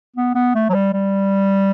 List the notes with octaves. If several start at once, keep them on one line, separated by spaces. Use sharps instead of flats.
B3
B3
A3
F#3
G3
G3